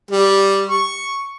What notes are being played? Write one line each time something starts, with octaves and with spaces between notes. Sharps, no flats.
G3
C#6